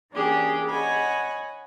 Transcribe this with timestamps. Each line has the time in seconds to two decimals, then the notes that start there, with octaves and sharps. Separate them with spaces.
0.12 E3 A#3 C#4 D4 G4 G#4
0.69 C#5 D#5 F#5 G#5 B5